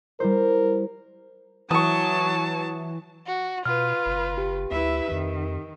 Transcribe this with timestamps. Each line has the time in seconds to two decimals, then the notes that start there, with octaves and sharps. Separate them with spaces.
0.20 G3 E4 A#4 C5
1.71 E3 F#3 A5 C#6 D#6
3.27 F#4
3.65 B2 F4 B4 F6
4.06 F#1
4.38 G4
4.71 D2 E4 B4 E5
5.11 F2 D#3